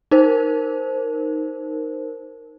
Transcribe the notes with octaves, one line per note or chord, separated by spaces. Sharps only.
D#4 A#4 C5